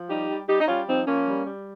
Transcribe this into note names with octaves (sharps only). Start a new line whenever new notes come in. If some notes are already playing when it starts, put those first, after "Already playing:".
Already playing: F3
G3 D#4 G4
G3
G3 D#4 G4
D#4
G3 C#4 F4
F3 C4 D#4
F3 A#3 C#4
G3
G3